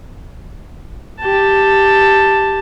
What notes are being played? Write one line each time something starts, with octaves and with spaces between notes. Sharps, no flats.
G4 A5